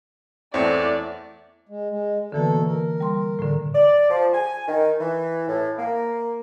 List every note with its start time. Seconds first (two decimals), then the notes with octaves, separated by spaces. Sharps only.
0.54 E2 A3 C4 C#5 D5
1.69 G#3
1.90 G#3
2.32 B2 D3 E3 A#3 A4
2.67 A#4
3.01 G3 C6
3.39 A2 D3
3.74 D5
4.09 F3
4.33 G#5
4.68 D#3
5.00 E3
5.48 A2
5.78 A#3